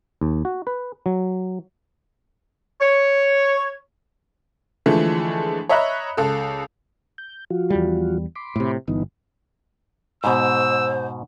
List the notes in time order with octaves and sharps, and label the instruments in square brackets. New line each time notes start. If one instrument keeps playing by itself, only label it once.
[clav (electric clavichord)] D#2
F#4
B4
F#3
[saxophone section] C#5
[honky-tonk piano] D3 E3 F3 G#3 A3
C#5 D#5 E5 A#5 B5 F#6
C#2 A4
[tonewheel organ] G6
F3 F4 F#4
[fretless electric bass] E2 G3
[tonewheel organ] B5 C6 D6
[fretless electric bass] A2 C3
[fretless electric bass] G1 [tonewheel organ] E3 B3 D#4
[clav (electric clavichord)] G#2 B2 [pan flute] C5 [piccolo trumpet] E6